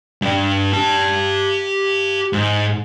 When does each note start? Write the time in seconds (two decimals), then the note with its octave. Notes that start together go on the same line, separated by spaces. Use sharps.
0.22 G2 D4
0.73 G4 A5
2.33 G#2